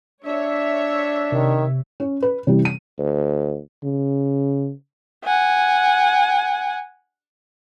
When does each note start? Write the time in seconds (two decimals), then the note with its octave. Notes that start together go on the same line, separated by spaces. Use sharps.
0.24 D4 C#5 E5
1.32 C3 D#3
2.00 C#4
2.22 B4
2.47 C3 E3 G3
2.65 D#7
2.98 D2
3.84 C#3
5.24 F#5 G#5